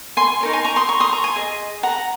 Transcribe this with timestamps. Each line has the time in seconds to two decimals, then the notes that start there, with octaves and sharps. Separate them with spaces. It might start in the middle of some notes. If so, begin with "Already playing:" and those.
0.17 G#5 C6
0.41 D#4 A#4 C#5
0.53 G#5 C6
0.65 A#5 C#6
0.76 C6 D#6
0.89 A#5 C#6
1.00 C6 D#6
1.13 A#5 C#6
1.24 G#5 C6
1.36 G#4 D#5
1.83 F#5 A#5